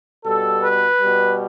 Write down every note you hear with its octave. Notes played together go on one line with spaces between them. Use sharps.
B2 G3 A4
B4
B2 G3